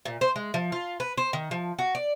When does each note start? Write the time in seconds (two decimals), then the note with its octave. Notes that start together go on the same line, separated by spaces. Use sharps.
0.05 A#2
0.21 C5
0.36 G#3
0.54 F3
0.72 F4
1.00 B4
1.17 C5
1.33 D#3
1.51 F3
1.79 F#4
1.95 D5